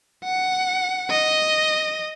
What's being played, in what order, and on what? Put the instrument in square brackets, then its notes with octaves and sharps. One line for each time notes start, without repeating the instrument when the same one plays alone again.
[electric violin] F#5
D#5